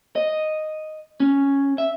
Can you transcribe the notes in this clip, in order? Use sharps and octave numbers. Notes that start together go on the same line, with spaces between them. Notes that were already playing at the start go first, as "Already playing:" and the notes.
D#5
C#4
E5